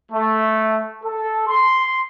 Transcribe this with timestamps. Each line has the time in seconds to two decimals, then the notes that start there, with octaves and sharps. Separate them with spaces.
0.12 A3
1.04 A4
1.48 C6